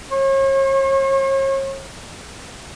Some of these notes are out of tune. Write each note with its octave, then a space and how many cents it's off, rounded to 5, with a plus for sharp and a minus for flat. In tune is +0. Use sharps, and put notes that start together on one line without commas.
C#5 -40